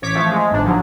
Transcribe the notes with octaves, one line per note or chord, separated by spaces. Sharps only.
A1 C#5 D6 B6
F3 A3 C#5
G#3 G#4
G1 G#2 D4
D3 F3 F#3